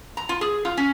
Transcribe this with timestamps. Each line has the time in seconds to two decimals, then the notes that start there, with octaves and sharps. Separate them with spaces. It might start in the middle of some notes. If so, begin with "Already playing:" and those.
0.17 A#5
0.29 F4
0.41 G#4
0.65 F4
0.77 C#4